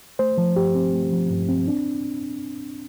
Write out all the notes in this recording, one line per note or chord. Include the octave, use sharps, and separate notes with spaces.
A3 C5
F3
G2 G4
C4
A3
F3
G2
C4
D4